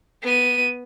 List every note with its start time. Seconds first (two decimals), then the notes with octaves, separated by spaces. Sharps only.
0.23 B3 D#7